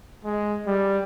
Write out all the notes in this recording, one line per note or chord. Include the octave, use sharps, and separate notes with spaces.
G#3
G3